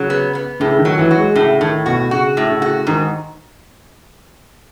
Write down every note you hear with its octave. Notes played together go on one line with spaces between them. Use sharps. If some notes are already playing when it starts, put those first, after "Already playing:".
Already playing: C#3 F#3
B3
B3
A2 C#3
D#3
F#3
E3
F#4
G#3
A2 C#3
A2 D#3
B2 F#4
C#3 F#4
A2
C#3
F#4
G#2 D#3